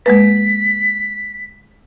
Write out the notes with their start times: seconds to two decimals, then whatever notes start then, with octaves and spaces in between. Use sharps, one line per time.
0.06 G#3 A#3 B4 B6